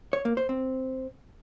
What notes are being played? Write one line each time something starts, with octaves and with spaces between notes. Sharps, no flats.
C#5
A#3
C5
C4